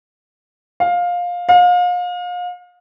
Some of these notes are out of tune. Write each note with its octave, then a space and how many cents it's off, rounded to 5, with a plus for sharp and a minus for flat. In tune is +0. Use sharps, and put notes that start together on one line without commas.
F5 +15
F5 +35